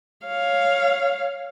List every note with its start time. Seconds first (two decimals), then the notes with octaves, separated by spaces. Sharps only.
0.26 C#5 F5